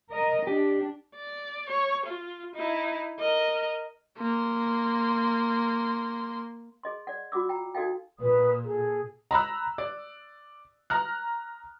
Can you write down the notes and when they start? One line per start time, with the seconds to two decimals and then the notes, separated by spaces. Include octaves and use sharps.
0.12 A#4 D#5
0.47 D4 G4
1.16 D5
1.70 C#5
2.06 F4
2.56 D#4 E4
3.19 A#4 D#5
4.18 A#3 C6
6.83 G#4 D#5 C6
7.07 D5 F#5
7.32 F4 F#4 F#5 D6 E6
7.49 G5 A#5
7.75 D#4 F#4 A4 D#5 F5 G5
8.20 A#2 B4 D#6
8.63 G#4 A4
9.31 A#5 B5 E6 F#6
9.78 D5
10.90 A#5 F6 F#6